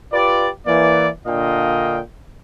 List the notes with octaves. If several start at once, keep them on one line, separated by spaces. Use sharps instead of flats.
F4 G4 B4 D5
E3 A#3 D5
A#2 D3 D4 D#5 F5 G5